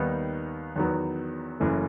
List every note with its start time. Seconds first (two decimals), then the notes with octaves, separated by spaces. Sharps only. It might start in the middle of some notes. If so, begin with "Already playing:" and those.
Already playing: D#2 D#3 G3 B3 D#4
0.76 E2 D#3 F#3 B3
1.60 F#1 F#2 E3 A3